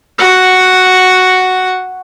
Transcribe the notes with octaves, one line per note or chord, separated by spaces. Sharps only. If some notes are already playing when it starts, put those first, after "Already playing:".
F#4 F#5